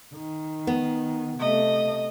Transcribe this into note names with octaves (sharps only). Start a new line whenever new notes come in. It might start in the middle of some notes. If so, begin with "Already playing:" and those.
D#3
B3
C3 A3 D#5